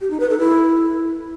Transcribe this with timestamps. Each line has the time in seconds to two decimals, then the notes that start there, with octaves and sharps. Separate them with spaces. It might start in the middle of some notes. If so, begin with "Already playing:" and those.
0.01 G4
0.10 D#4
0.20 B4
0.30 A4
0.39 E4